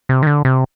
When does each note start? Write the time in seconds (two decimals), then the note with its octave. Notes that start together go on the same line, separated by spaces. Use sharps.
0.09 C3
0.23 D#3
0.27 D3
0.45 C3